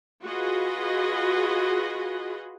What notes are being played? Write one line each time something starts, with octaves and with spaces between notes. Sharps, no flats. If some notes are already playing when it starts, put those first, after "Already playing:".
F4 F#4 G#4 B4 D#5